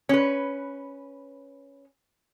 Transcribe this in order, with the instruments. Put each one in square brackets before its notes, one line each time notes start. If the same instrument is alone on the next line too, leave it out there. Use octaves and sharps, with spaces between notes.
[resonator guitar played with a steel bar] C#4 B4